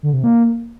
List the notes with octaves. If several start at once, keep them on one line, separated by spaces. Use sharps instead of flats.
D3
C3
A#3